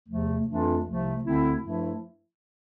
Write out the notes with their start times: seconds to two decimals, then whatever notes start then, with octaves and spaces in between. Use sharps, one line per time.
0.07 E2 C3 F3 A3
0.46 F2 E3 A3 D4 F4
0.84 C2 C3 F3 A3
1.22 D2 D3 A3 C4 E4
1.61 G2 F3 A3 E4